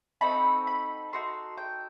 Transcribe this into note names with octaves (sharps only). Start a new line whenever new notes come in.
C4 D#4 F#4 A4 B5
B5
D#4 F#4 A4 C6
G5